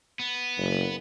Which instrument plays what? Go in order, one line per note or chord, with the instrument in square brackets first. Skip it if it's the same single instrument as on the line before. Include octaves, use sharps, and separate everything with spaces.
[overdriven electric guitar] B3
[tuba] F#1